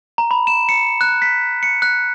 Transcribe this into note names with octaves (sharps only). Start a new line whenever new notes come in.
A#5
B5
E7
C#7
F#6
B6
C#7
F#6